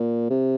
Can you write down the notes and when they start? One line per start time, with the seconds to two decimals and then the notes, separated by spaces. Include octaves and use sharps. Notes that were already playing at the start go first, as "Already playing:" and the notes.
Already playing: A#2
0.31 C3